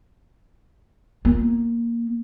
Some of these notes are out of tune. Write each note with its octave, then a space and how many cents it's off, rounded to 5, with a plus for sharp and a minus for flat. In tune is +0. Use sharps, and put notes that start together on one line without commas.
A#3 +0 F4 +0